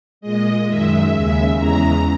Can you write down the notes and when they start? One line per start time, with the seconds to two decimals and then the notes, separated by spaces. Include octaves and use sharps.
0.21 A#2 G#3 D#5
0.66 F#2 D#3 G#3 E5
1.11 D#2 C#3 G#3
1.56 E2 C#3 E3 G#3 A#5